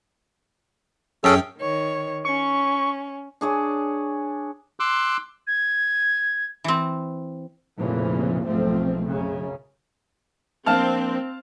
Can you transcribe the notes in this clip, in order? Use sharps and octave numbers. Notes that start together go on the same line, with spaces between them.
F#2 C#4 G#4 A4 G5
D#3 C#5
C#4 C#6
D4 G#4 C#5 G#5
C6 D6 E6 F#6
G#6
E3 C4
F1 F2 A#2 C#3 E3 F3
B1 G#2 F3 A3 C4
F#2 C#3
F3 A#3 C4 D4 F5 A5 F6